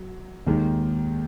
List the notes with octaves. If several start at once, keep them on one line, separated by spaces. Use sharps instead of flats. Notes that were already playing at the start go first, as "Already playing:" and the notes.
Already playing: F#3
D#2 D#3 G#3